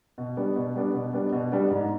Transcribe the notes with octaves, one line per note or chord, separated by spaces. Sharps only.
B2
G3 B3 D4
B2
G3 B3 D4
B2
G3 B3 D4
B2
G3 B3 D4
G#2